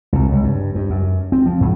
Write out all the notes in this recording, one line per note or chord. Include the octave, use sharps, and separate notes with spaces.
C2
C#2
G2
G2
F#2
C4
F3
G#2